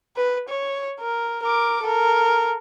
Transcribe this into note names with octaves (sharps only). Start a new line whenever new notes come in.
B4
C#5
A#4
A#4 D6
A4 A#4